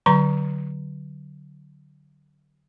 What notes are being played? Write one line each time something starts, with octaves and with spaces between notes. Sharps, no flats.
D3 F#3 A#5 C6